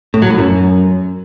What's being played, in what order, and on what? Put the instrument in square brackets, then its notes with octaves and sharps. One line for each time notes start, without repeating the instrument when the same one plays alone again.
[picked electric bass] A2
F#3
A2
F#2